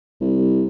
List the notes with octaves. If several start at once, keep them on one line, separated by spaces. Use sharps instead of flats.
C2